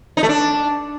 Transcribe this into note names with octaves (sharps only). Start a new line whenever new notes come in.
D#4
A3
D4